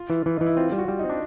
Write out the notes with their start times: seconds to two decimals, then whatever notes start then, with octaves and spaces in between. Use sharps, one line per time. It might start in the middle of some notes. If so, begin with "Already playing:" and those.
Already playing: F4
0.10 E3
0.26 E3 E4
0.37 E3 D#4
0.46 E4
0.57 C4 F4
0.72 G3
0.78 F#4
0.88 G3 F4
0.99 D#4
1.04 C4
1.09 D4